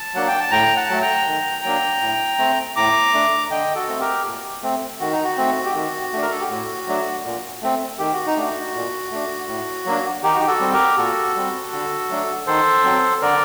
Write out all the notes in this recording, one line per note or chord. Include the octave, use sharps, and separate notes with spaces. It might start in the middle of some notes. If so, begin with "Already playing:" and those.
Already playing: A5
F#3 A#3 D4 F#5
G5
A5
A2 G5 A#5
F#5 A5
F#3 A3
G5 A#5
D#3
F#3 A#3 D4
A2
A3 C4
A2 A#5 D6
A3 D4
D3 D#5 G5
F#4 A4
A3 C4
G4 A#4
A#2
A3 C4
D#3 F#4
D#4
F#4
A3 C4
G4
D#3 F#4
A3 D4
A#4
A4
G4
A2 F#4
F#3 A3 D4
A#2
A3 C4
D#3 G4
F#4
D#4
A3 D4 F#4
A#2
A3 D4
A2
F#3 A#3 D4
D#3 D#4 G4
F#4
G4
F#4 A4
G3 C4
G4 A#4
A#2 F#4 A4
G3 C4
D3
F#3 A3 D4
D#3 A4 C5
F#3 C4
D3 A#4 D5